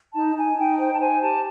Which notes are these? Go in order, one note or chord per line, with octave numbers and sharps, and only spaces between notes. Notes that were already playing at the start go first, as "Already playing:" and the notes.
D#4 A5
D#4 G#5
D#4 G5
C5 G5
A5
C5 G#5
G4 A5